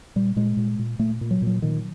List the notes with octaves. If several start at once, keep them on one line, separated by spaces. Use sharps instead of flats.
A#2 G3
A#2 G#3
A#2
A#2
A#2 A3
A#2
F#3
A#2
F#3
A#2 D#3